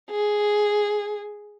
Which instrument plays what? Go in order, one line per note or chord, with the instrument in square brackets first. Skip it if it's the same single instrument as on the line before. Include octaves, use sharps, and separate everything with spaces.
[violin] G#4